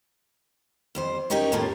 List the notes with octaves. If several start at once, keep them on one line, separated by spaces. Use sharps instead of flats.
F2 G3 C5
C#4 D#4 G4 G#4 A#4 C#5
A2 F3 A3 A#3 C#4 F4